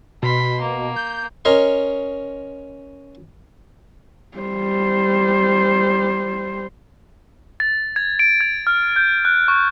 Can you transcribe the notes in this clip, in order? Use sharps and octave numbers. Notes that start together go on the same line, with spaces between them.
B2 B5 C6
A#3
G6
C#4 A#4 C#5 D#5 C6
G3 C5
A6
G#6
D7
G#6
F6
G6
F#6
C#6